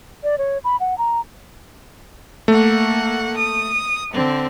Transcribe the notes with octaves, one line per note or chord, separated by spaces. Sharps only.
D5
C#5
B5
F#5
A#5
A3 A#3 F#5
D#6
D3 C4